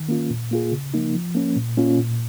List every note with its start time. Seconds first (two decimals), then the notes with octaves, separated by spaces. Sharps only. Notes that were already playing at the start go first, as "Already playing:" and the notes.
Already playing: D#3
0.09 A#3 C#4 F4
0.30 A#2
0.51 A#3 F4 G#4
0.72 C#3
0.94 F3 A#3 D#4
1.14 F3
1.35 A#3 C#4
1.57 A#2
1.77 A#3 C#4 F4
1.99 A#2